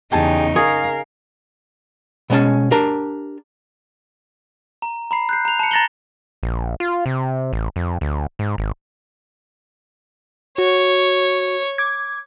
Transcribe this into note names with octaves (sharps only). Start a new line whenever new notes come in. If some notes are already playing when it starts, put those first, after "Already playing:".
E2 C#3 D#4 G4 G#4 A5
G#4 A#4 F5 C#6
B2 G#3 C#4 A5
D4 G4 A#4
A#5
A#5 B5 C7
F#6 G6 C7
A#5 F7
A5 C#7
A#5 A6 A#6 F#7 G7
A#1
F4
C3
A1
F2
D2
G#2
G#1
F#4 C#5
D6 G#6